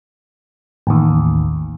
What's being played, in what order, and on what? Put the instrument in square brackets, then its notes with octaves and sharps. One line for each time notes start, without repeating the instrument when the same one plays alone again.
[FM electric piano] A1 D#2